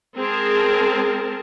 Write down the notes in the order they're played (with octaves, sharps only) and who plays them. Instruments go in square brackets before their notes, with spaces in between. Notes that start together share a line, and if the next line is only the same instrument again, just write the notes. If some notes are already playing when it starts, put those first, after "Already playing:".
[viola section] G#3 C4 G#4 A#4 A5